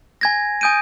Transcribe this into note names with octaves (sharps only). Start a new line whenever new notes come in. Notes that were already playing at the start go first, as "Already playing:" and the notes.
G#5 G#6 A#6
G#5 D#6 G6 D7 D#7